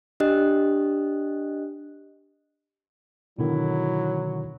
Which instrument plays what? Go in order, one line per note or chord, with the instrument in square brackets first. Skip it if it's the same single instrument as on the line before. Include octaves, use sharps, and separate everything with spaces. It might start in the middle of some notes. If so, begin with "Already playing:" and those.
[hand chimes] D4 G4 D#5 F#6
[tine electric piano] B2 D3 D#3 [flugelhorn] F#3 [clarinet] E4